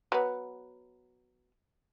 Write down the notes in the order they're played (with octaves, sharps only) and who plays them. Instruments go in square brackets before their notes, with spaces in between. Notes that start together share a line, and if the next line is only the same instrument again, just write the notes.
[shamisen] F#3 B3